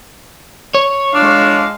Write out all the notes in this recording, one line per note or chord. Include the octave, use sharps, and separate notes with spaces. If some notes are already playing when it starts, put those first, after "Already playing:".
C#5
G#3 D4 F5